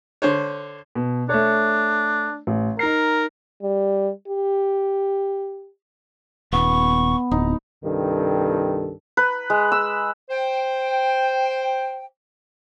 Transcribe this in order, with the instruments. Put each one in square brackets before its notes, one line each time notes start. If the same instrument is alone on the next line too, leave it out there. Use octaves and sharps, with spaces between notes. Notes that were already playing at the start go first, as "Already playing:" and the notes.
[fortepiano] D3 C5 C#5
[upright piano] B2
[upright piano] A3 C#5 [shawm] D4
[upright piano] A1
[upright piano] D#4 C7 [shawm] A#4
[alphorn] G3
G4
[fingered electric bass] D#1 [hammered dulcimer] B3 [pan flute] C#6
[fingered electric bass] D1 [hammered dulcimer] D#4
[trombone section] C2 G2 D#3 A4
[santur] B4
G#3
E6
[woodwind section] C5 G5